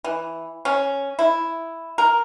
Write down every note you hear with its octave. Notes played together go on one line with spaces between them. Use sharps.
E3
C#4
E4
A#4